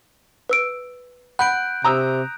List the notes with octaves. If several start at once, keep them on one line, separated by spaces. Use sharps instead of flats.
B4 E6 D7
F#5 B5 F#6 G6 D7
C3 A#5 D#6 E6